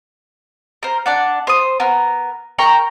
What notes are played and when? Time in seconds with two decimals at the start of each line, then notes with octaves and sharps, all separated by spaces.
0.83 A#4 C5
1.06 D4 D5 F#5
1.47 C5 D#6
1.80 B3 A#4
2.59 A#4 G5 A#5 C#6